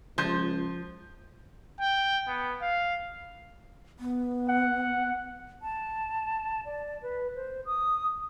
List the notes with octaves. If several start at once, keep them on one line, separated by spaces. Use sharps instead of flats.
C#2 F3 C6 G6 G7
G5
B3
F5
B3
F#5
A5
D5
B4
C5
D#6